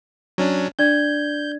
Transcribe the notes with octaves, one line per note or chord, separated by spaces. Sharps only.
F#3 C#4 D4
D4 D5 G6 G#6